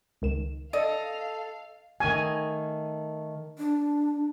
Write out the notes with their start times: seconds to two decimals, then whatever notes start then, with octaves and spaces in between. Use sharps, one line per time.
0.22 C#2 D#3 E7
0.73 A4 D5 D#5 F5
2.00 D#3 A3 G#5
3.58 D4